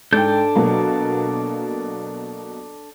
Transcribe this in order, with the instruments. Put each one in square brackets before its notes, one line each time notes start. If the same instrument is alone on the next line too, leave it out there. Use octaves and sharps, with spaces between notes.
[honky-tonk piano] G#2 G5 [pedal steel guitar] D4 A4 G6
[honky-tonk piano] B2 F#3 A#3